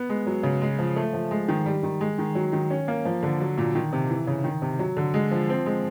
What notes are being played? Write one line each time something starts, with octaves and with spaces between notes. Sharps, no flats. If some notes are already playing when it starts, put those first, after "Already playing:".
Already playing: B3
G#3
F#3
C#3
G#3
F3
A3
F3
G#3
D#3
G3
D#3
G#3
D#3
F#3
D#3
C#4
A#3
F3
D3
F#3
A#2
D#3
C3
E3
C#3
D#3
C3
F#3
D3
G#3
F3
C4
G#3